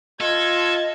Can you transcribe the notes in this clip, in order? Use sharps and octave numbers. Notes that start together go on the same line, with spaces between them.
F4 A4 D#5 G#6